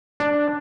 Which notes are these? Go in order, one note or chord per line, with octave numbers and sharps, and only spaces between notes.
D4